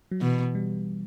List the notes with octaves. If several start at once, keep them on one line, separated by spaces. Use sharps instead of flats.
F#3
B2 E3
G3